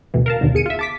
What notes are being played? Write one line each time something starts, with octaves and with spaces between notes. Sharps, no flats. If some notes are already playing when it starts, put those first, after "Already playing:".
D2 B2 E3
A#4 F5 A5
D#2 B2 D3 D#3
E2 G#4 C#7 D#7
F4 E5
A5 D6 B6